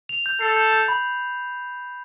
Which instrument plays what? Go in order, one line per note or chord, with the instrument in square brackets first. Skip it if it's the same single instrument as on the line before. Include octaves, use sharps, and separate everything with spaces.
[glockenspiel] F7
G6
[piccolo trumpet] A4 [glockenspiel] C7
[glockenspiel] G6
G6
B5